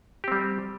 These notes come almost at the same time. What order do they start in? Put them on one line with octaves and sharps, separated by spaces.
G4 C4 G3